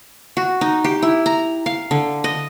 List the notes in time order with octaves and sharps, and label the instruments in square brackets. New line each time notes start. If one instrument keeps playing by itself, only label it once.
[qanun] F#4
D#4
G4
E4
A#5
F5
D3
D#5